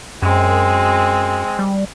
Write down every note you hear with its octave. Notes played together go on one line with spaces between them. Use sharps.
F#2 G#3 C4
G3